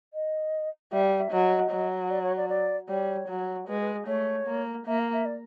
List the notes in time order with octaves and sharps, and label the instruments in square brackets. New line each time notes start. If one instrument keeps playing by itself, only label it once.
[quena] D#5
[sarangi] G3 [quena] E5
[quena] F5
E5
[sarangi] F#3 [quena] D#5
[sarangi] F#3
[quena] D5
C#5
D5
D5
[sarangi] G3 [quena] C#5
[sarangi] F#3
[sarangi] G#3 [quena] B4
[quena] B4
[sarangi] A3 [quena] C#5
[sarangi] A#3
[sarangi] A#3 [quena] E5
[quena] F5
E5
D5